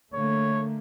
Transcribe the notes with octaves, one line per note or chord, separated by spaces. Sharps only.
D3 A3 A#3 C#5